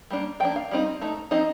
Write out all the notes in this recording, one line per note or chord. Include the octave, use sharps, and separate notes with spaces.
G3 A#3 D4
F3 A#3 D4 G5
F5
G3 C4 D#4
A3 D#4
F3 C4 D#4 D#5